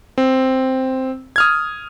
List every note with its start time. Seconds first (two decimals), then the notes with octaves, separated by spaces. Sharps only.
0.18 C4
1.36 D#6 F6 G#6